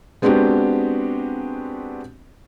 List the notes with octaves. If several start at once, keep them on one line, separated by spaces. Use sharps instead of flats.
G#3 B3 C4 D4 F#4 G4